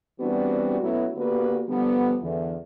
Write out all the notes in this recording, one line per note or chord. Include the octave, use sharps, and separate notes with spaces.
E3 G3 B3 C4 D4 F#4
B2 F#3 A3 B3 C#4 E4
D3 A#3 B3 F#4 G4 B4
D3 F3 G3 B3
E2 D3 E3